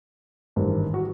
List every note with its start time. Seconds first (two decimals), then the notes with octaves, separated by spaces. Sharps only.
0.56 G#1 G2 E3 G3
0.94 F#4